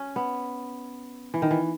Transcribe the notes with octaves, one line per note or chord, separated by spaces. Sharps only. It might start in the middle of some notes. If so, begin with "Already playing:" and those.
Already playing: C#4
B3
E3
D#3
E3